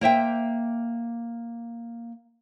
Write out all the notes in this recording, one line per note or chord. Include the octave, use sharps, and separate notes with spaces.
A#3 C5 E5 G5